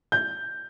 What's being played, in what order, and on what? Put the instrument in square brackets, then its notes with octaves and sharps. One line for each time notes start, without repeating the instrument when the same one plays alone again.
[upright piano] G6